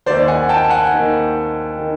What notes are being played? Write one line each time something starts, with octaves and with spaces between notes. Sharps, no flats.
D#2 D#3 C5 D5
F#5 G#5
G5 A5
A5
F#5 G#5
D#2 D#3
D#3